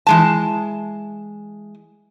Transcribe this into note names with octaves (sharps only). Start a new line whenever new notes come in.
E3 G#3 A5